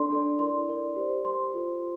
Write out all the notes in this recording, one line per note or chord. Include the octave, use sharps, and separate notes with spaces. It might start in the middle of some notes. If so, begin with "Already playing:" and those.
Already playing: D4 A4 D5 C6
D4 A4 D5
E4 A#4 D5 C6
E4 A#4 D5
G4 C5
G4 C5 C6
F4 A4 C5